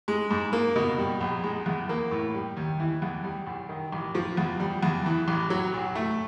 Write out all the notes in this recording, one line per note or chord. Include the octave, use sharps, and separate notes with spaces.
G#3
G#2
A#3
B2
G3
A#1
G#3
E2
A#3
A2
G3
D#2
E3
E2
G3
B1
D#3
A1
F3
E2
G3
E2
E3
A1
F#3
B1
A3